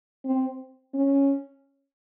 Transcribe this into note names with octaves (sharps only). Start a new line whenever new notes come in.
C4
C#4